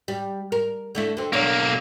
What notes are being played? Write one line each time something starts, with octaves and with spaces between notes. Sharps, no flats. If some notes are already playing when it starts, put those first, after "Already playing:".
G3
A#4
D3 A3 E4
D3 C4
B1 A#3 D4 C#5